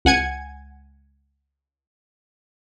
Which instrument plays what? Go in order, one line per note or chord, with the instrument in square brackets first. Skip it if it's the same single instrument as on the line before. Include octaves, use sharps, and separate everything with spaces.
[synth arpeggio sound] C#2 F#5 G#5 G#6 C#7